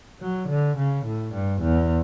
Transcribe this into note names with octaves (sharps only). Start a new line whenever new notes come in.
F#3
D3
C#3
A2
G2
E2